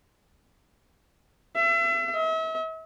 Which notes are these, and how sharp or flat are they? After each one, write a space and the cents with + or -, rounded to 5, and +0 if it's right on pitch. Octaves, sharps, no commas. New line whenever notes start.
E5 +35
E5 -40